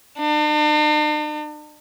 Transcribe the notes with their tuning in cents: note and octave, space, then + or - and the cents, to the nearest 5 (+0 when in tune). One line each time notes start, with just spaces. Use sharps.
D4 +45